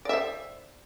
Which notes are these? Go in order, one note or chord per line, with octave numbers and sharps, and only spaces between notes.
C5 D5 E5